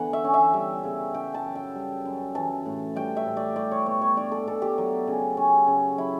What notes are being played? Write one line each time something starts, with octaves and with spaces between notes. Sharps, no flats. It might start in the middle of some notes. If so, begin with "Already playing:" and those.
Already playing: D3 E3 B3 F#5
E5
C#4
E5
G3
C#3
C#3 G5
A5
F#2
G5
G3
F#2
E3 A5
A2
G3 G5
E5
A2
D5
G3 D5
C#5
B2 C#5
C#5
D4 D5
A4
B2 A4
G4
F#3
C#3
C#4
C#3
F#3 E4